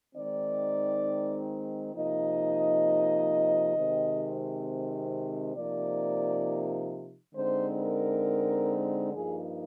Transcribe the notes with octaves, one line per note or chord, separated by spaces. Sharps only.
D#3 G#3 C4 D#4 D5
C3 F3 A#3 D#4 D#5
C3 D#3 G#3 C4
C3 F3 A#3 D#4 D5
D3 G#3 C4 D#4 C5
A#4
G2 F3 A#3 D#4 G#4